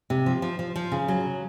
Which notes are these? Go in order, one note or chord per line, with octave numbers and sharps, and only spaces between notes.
C3
F3
F3
F3
F3
C#3
F#3